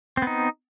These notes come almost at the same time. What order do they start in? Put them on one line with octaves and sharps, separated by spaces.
C4 B3 D#4